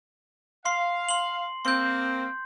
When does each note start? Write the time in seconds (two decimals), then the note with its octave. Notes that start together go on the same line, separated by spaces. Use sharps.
0.65 F5 C6 C7
1.09 C6 F#7
1.65 A#3 C4 C6 G6